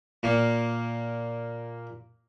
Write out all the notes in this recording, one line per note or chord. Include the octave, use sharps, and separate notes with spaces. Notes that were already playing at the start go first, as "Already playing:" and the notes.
A#2 A#3